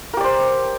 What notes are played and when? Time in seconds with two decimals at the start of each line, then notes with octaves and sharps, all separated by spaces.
0.13 A#4
0.17 G4
0.20 D5
0.24 C5